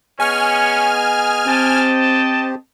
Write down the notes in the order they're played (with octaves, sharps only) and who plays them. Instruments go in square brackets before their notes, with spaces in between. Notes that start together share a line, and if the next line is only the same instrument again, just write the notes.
[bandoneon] B3 G#4 D#5 [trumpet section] C#4 C#5 [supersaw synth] G#5 F6
[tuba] C4 [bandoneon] G4 C5 [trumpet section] D#5 G5 A5